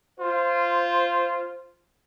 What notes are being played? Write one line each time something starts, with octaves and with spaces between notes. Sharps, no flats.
F4 C5